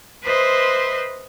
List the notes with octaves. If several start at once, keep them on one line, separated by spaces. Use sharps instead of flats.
B4 C5 D#5 E5 C6